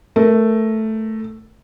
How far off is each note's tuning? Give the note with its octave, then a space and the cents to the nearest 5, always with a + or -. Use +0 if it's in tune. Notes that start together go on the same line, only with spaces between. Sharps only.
A3 +0 A#4 +10